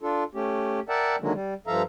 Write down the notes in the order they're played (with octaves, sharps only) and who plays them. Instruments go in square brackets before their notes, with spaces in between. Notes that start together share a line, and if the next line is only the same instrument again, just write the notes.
[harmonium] D4 F4 A4
A3 C#4 G4
A#4 D5 E5 F#5 G5 A5
D3 D#3 F#3 G#3 A#3
G3
G2 F3 A4 E5 F5 A#5